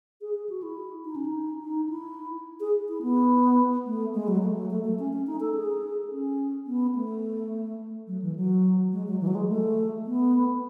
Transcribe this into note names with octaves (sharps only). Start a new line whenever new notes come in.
G#4
G#4
F#4
E4
D#4
C#4
D#4
D#4
E4
G#4
E4
B3
A3
G#3
F#3
A3
F#3
A3
A3
C#4
C#4
D#4
A4
G#4
C#4
B3
A3
F#3
E3
F#3
G#3
F#3
E3
F#3
G#3
A3
B3